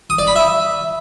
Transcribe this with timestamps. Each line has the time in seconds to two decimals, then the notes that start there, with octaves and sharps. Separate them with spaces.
0.10 D#6
0.19 D5
0.27 B5
0.36 E5